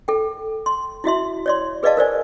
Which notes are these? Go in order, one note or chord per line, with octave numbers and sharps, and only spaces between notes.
A4 G5
C6
E4 F#4 E5 C6
C#5 D5 C6
G#4 B4 D5 D#5 F5 A5
A#4 C5 D5 G#5